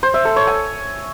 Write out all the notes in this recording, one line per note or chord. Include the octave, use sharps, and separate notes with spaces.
C5
E5
A4
C#5
G#5